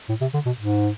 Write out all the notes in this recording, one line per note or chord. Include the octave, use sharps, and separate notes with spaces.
A2
C3
D3
B2
G#2